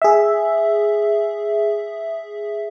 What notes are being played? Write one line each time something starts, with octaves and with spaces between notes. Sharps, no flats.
G#4 E5